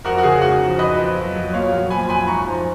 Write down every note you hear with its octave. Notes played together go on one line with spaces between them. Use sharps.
F2 F#4 A#4
F#4
C#3 G#4
G#2 F#4
F3
F2 B4 D#5
F2
F#3
F#3
A#2 C#5 F5
F#3
F3 G#5 B5
F2 G#5 B5
G#2 A#5 C#6
F3